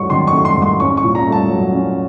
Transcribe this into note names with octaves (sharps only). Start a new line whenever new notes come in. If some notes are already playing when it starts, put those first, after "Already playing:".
Already playing: G#2 F#3 A3 C#6
D#3 C6
C#6
A3
C6
G#2
C6
C#4 C#6
C#6
A#2
A#5
A3
A5
F#3
C#4